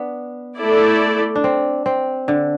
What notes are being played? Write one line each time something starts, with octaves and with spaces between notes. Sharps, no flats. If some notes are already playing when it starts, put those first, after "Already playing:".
Already playing: B3 D4
A3 E4 A4 D5
D4
C4
C4
D3